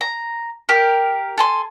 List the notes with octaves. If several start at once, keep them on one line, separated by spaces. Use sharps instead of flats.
A#5
G4 A#4
A4 G#5 C6